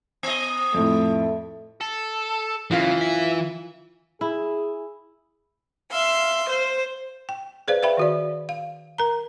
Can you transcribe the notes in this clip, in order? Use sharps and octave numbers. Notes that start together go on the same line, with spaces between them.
B3 D#5
F2 A2 A3
A4
F#2 C#3 E3 F4 F5
E5
E4 G#4
E5 F5 C6
C5
G5
G#4 B4 C5 D5 F5
B4 E5 F5 G5 B5
D#3 F#4 D5
F5
A#4 A#5